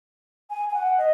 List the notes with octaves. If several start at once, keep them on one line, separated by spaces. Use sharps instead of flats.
G#5
G#5
F#5
D#5